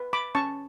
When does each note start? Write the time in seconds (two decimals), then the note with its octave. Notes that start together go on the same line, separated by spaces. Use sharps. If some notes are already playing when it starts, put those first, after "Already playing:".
Already playing: B4
0.13 B5 D6
0.35 C#4 A5 C#6